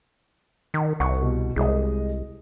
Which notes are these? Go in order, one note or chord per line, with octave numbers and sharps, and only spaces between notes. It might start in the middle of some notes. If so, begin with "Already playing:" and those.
D#3
C2 F#5 C#6
B2
C2 G#3 D#5